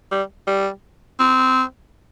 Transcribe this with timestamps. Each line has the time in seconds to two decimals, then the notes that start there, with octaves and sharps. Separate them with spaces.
0.11 G3
0.47 G3
1.20 C4